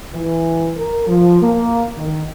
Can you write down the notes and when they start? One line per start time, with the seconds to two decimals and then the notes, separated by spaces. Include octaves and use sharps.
0.14 E3
0.77 A#4
1.07 F3
1.42 A#3
1.97 D#3